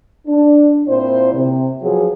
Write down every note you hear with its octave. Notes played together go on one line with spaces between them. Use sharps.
D4
A#2 C4 E4 C5
C3
F3 F#3 B3 G#4